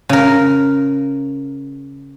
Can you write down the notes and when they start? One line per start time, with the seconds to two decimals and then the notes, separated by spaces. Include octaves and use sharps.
0.09 C#3 A#4